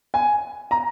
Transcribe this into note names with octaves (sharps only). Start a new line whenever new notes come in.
G#5
A#5